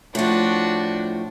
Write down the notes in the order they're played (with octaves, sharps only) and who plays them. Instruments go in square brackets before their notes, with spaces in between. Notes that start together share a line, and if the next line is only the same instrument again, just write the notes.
[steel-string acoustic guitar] A2 F3 [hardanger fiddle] D4 F#4